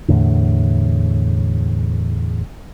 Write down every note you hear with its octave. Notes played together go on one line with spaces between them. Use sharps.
E2 A2 D3